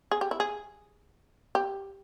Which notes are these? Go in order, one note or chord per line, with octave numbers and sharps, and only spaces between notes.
G#4
G4
E4
G#4
G4